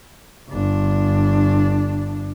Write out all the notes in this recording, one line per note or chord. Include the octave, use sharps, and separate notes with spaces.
G1 D4